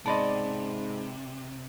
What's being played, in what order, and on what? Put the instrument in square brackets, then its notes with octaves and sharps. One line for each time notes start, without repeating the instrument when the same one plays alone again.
[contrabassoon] G#2 [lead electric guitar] C3 [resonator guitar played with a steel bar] B3 D5 D#5 [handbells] A5 B5 C6